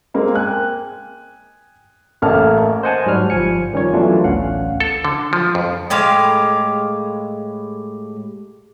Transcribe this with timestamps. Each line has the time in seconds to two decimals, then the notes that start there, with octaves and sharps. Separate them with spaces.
0.14 G#3 A#3 C4
0.35 G5 G#5 F#6
2.22 A1 A3 A#3 D#5 A5 F6
2.83 C5 D#5 F#5 G#5 A5
3.06 G#2 F#3 G3 C#5 F6
3.30 G1 F3 G#5 C#7
3.73 D#3 G3 C#4 D#4 F4 C#5
3.94 E3 F#3 A3 B3 D4 F4
4.24 A1 D2 C#4 F5 F#5
4.80 A4
5.05 D3
5.33 F3
5.55 F2
5.90 A2 G#3 G4 F5